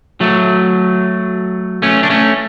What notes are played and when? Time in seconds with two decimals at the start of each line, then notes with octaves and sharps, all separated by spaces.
0.21 F#3 A3
1.82 A3 C#4
2.03 D4
2.10 A3 C#4